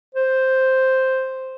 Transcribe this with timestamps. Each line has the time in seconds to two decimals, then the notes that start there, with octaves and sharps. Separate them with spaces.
0.15 C5